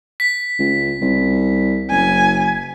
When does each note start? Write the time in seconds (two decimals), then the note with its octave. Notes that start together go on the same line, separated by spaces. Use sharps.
0.20 B6
0.59 C#2
1.01 C2
1.90 F#1 G#5